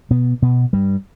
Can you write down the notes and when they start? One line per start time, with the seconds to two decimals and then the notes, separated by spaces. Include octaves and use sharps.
0.10 B2 B3
0.42 B2 B3
0.73 G2 G3